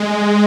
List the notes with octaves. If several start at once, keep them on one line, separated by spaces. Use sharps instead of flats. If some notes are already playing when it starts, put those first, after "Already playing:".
Already playing: G#3